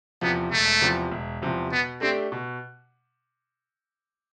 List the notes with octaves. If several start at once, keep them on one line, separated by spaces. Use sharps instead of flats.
E2 C3 F3 B3
E1 A3
E2 C3 F3
E1
E2 C3 F3
B2 B3
A3 C4 D4 G4
B2